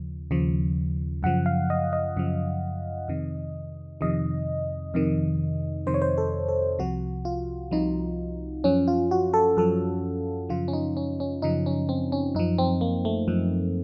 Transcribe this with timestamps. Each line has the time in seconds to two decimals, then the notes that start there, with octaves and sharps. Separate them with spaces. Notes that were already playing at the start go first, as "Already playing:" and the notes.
Already playing: D#2 C#3 F3
0.31 D#2 C#3 F3
1.23 F#2 C#3 F3 F#5
1.46 F5
1.70 D#5
1.93 D#5
2.16 F#2 C#3 F3
3.08 F2 C3 D#3
4.01 F2 C3 D#3 D#5
4.94 F2 C3 D#3
5.86 F2 C3 D#3 C5
5.94 C#5
6.02 C5
6.18 A4
6.49 A4
6.79 C2 C3 F3 F#4
7.25 F4
7.71 C2 C3 F3 D#4
8.64 F#2 F3 C#4
8.88 F4
9.11 F#4
9.34 A4
9.57 F#2 F3 A4
10.49 F#2 C#3 F3 F4
10.68 C#4
10.73 D#4
10.97 C#4
11.20 C#4
11.42 F#2 C#3 F3 D#4
11.66 C#4
11.89 C4
12.12 C#4
12.35 F#2 F3 D#4
12.58 C4
12.81 A#3
13.05 A3
13.28 F#2 F3